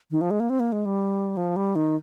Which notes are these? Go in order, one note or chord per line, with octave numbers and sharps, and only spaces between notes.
D#3
F3
G#3
A#3
C4
A#3
G#3
G3
F3
G3
D#3